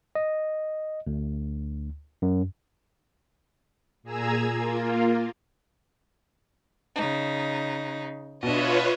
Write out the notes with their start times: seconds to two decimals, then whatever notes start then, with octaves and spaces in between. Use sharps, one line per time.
0.15 D#5
1.07 D2
2.22 F#2
4.03 A#2 G#4 G#5 A#5 E6 G#6
4.46 A#3 F4
6.95 C#3 D#4
8.43 B2 D4 F4 B4 C#5 D#5 E5